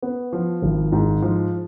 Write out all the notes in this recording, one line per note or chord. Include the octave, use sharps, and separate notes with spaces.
B3
F3
G#1
G#2
F3